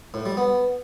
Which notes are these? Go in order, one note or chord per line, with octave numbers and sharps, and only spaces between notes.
A2
G3
B3